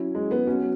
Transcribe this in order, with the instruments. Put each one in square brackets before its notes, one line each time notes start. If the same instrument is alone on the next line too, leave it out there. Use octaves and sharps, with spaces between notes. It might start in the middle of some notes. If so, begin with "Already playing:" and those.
Already playing: [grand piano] F#3 C#4 E4
[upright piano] G#3
B3
[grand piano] F#3 B3 F#4 [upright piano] C#4